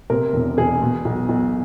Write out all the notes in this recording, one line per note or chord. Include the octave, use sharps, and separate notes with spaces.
C3 A#4
E1
E1 G#4
B2
B1
B1